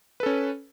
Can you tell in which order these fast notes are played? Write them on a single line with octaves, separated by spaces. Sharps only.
B4 A4 C#4